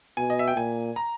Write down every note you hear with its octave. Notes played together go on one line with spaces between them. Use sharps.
B2 G#5
D#5
E5
G5
A#2 G#5
A#5